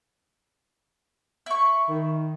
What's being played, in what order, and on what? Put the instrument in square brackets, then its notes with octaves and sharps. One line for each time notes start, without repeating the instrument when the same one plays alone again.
[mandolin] E4 C#6
[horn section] D#3